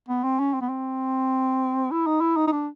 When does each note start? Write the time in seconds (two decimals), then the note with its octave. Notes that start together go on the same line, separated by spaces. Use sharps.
0.09 B3
0.23 C4
0.39 C#4
0.54 C4
0.61 B3
0.69 C4
1.91 E4
2.07 D#4
2.21 E4
2.37 D#4
2.47 D#4
2.52 D4